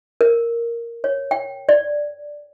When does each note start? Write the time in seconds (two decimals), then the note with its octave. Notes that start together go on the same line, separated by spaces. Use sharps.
0.21 A#4
1.04 C#5
1.31 G5
1.69 D5